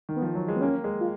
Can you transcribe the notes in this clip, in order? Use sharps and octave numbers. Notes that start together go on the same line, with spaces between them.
D#3
B3
F3
F#3
G#3
B3
A#3 C#4
G#3
F4